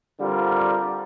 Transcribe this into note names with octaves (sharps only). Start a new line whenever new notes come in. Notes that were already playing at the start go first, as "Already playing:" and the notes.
D3 G3 C4 F4 A#4